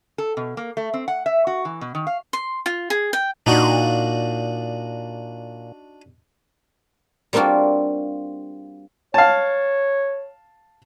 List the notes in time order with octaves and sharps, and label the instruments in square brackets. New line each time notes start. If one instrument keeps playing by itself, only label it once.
[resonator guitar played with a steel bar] A4
B2
A#3
A3
C4
F#5
E5
F#4
E3
B2
D#3
F5
[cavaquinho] C6
F4
G#4
G5
[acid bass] A#2 [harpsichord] D4 D#4 F#4
[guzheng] G3 A#3 C4 D4 F4 F#4
[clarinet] C#5 [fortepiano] F5 A5